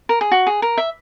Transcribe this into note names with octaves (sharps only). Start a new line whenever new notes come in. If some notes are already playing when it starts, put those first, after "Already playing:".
A#4
G#4
F#4
G#4
A#4
E5